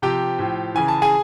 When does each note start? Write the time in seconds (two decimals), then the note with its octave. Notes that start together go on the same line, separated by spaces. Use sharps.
0.02 C3 F3 G4 G5
0.39 A2 F3
0.75 C#3 E3 G#5
0.88 A5
1.02 G#4 G#5